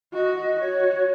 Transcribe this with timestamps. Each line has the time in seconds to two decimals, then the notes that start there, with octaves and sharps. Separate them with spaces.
0.13 F#4 D#5
0.59 F#4 C#5